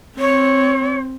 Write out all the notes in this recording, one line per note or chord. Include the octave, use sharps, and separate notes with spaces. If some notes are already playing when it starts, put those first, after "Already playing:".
C4 C#5